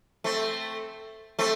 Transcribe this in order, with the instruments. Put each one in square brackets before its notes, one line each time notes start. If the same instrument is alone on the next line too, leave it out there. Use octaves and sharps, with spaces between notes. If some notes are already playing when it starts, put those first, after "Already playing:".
[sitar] A3 C4
A3 C4